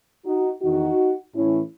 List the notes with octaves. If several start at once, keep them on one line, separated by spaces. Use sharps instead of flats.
D#4 F#4
E2 D#3 D#4 F#4
A2 E3 C#4 E4